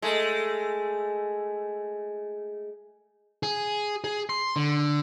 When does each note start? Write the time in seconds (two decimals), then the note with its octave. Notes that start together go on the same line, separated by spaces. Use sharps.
0.02 G#3 A3
3.43 G#4
4.04 G#4
4.29 C6
4.56 D3